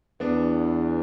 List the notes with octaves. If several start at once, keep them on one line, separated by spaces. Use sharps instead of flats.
E2 B3 D4